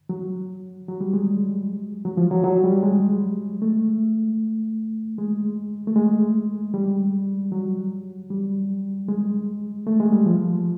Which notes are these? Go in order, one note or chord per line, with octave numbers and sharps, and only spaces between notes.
F#3
F#3
G3
G#3
F#3
F3
F#3
F#3
G3
G#3
A3
G#3
A3
G#3
G3
F#3
G3
G#3
A3
G#3
G3
F3